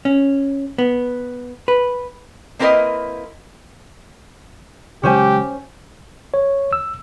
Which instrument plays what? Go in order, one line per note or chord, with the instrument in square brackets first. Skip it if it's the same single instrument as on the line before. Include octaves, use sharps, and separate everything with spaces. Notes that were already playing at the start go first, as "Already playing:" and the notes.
[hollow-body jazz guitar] C#4
B3
B4
[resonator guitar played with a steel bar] A#3 C4 E4 A#4 B4 D#5
[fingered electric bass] C#3 F#3 G#3 [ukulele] C#4 C5 G#5 [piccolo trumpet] G4
[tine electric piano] C#5
E6